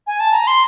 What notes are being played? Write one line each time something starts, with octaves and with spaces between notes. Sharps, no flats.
G#5
A5
A#5
C6